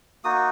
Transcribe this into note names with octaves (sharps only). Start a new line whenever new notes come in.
A#3 D#4 F#4 D#6